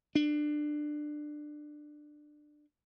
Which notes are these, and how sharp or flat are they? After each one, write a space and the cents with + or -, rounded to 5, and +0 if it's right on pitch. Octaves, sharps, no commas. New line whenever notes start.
D4 +20